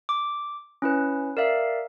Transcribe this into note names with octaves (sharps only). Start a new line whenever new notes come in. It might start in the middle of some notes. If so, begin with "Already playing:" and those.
D6
C#4 E4 B4
A#4 D5 E5 F5